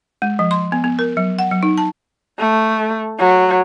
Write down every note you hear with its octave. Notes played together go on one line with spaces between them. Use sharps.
G#3
F3
C6
B3
B3
A#4
F#3
F#5
F#3
D#4
A5
A3
F#3